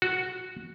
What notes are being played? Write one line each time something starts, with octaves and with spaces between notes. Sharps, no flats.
F#4